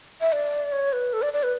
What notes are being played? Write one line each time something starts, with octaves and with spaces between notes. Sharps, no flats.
E5
D5
C#5
B4
A4
D5
D5
B4